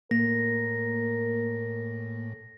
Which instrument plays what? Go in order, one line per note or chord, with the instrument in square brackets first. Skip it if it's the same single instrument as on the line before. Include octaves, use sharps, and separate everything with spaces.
[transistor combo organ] A2 [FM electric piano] A#3 [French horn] A#4 [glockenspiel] A#6